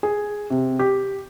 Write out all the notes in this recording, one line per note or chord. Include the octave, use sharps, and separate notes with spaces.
G#4
C3
G4